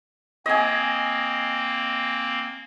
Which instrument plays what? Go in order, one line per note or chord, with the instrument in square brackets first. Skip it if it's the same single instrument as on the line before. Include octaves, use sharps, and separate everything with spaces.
[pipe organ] A#3 C4 [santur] D#5 G#5